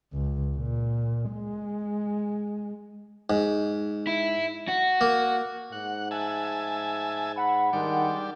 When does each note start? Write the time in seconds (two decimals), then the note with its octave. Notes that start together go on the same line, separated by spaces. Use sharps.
0.13 C#2
0.57 A#2
1.31 G#3
3.30 G#2
4.07 E4
4.68 F#4
5.01 A#3
5.72 G#2 F#5
6.11 E5 G#5 A5
7.37 F#5 B5
7.73 D#3 G3 G#3 D4